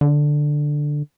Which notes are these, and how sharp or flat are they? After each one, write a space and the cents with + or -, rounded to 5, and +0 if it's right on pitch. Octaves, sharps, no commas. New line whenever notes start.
D3 +5